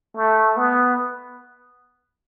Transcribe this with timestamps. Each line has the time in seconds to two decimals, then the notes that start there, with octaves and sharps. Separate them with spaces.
0.16 A3
0.57 B3